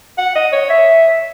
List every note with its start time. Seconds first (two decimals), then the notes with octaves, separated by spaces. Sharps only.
0.18 F#5
0.35 D#5
0.53 C#5
0.70 E5